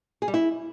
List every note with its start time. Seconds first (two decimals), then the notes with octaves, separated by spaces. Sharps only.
0.22 G#4
0.28 G3
0.34 E4